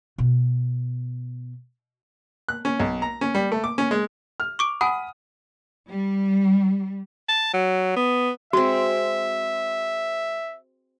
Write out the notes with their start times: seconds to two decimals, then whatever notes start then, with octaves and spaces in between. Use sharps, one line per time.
0.18 B2 B3
2.49 F#6
2.65 C#4
2.80 B1
3.02 A#5
3.21 C#4
3.35 G3
3.52 A3
3.64 D6
3.78 C#4
3.91 G#3
4.40 F6
4.59 C#6 D6 D7
4.81 F#5 G#5 B5 D#6
5.88 G3
7.29 A5
7.53 F#3
7.96 B3
8.53 G#3 C4 F#4 E5